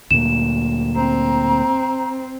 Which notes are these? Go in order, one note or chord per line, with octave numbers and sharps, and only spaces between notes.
D2 A#2 E7
C4 A#5